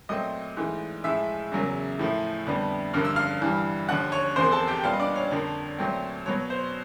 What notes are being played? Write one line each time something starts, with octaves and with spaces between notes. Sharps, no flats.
A#2 F#3 A3 C4 D#5 D#6
G#2 E3 A3
A2 F3 G#3 E5 E6
E2 C#3 F#3 A#3
A2 F3 A3
F2 D3 G3 B3
G2 D3 F3 A#3 F6
E6
F5 F6
G2 E3 G3
D#2 D3 F3 F#5 F#6
C#5 C#6
E2 C3 F3 A#3 C5 C6
A4 A5
G4 G5
A#2 G3 B3 F4 F5
D#5
D4 D5
C#5
F2 D3 F3 A#3
A#2 F#3 A3 C4
B2 F#3 B3 C#5
C5